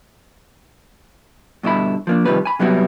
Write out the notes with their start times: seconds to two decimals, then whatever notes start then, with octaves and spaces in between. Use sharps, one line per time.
1.63 G2 B2 D3 E4 B5
2.07 F3 A#3 D4
2.25 C3 D#3 F3 G3 B4
2.45 G#5 B5
2.59 C3 F#3 G3 B3 E4 F#4